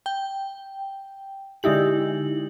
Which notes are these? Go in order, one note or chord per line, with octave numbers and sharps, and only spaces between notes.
G5
D3 G#3 D#4 E4 G4 F#7